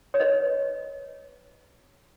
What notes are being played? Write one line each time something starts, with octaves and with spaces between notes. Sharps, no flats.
C#5
B4 D#5